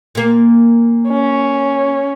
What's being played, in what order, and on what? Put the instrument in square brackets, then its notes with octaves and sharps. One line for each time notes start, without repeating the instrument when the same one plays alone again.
[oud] A#2 A#3
[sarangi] C#4